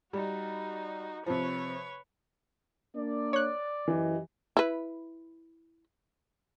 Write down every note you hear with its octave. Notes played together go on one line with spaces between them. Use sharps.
G3 D#4 F#4
C3 F3 B4 C#5
A#3 D4 D5
C#5 F#6
F#2 E3 G4 D#5
E4 B4